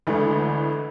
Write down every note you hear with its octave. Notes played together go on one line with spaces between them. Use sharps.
D2 D3 E3 G#3 A3